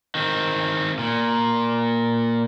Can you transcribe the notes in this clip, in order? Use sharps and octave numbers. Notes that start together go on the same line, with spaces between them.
D#3 C4
A#2